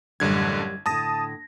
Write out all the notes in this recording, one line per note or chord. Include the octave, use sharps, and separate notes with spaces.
A1 F#2 D3 G3 G#6
A2 D3 A5 D#6 A#6